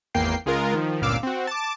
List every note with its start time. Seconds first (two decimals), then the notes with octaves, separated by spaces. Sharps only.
0.14 G#1 E2 A#3 G5 C7
0.46 C#2 G#3 F4 A#4
0.74 D#3 F3
1.02 G1 C#2 A#2 F5 D6 E6
1.23 C4 F#4
1.47 A5 D6